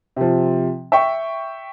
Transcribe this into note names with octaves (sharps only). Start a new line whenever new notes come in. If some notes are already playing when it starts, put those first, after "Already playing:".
C3 F3
E5 G5 C#6